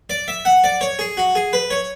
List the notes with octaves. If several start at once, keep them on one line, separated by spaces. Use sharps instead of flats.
D5
E5
F#5
D5
C#5
G#4
F#4
G#4
B4
C#5